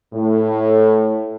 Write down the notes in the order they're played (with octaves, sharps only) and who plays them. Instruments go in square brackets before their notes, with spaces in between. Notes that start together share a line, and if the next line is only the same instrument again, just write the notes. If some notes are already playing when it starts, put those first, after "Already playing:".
[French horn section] A2